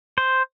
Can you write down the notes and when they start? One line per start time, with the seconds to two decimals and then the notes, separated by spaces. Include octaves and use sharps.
0.18 C5